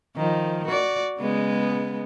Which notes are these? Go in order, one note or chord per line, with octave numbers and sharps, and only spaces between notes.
D#3 F3
F#4 D5
C#3 G#3 B3